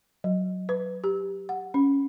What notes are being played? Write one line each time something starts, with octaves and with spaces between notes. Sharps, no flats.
F#3
B4
G4
F#5
C#4